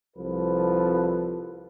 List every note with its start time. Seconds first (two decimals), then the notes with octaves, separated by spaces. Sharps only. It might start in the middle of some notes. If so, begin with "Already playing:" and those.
0.16 C2 F3 A4 B4